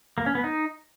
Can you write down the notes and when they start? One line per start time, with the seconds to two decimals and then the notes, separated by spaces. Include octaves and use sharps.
0.18 A#3
0.26 C#4
0.35 B3
0.44 D#4